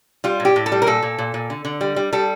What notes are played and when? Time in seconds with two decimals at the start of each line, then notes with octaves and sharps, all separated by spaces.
0.24 G3 F4
0.40 A2
0.45 G4
0.56 A2
0.66 A4
0.72 G3
0.82 A#4
0.87 A#2 A4
1.03 A#2
1.18 A#2
1.34 A#2
1.50 D3
1.65 D3
1.81 G3
1.96 G3
2.13 G3 A4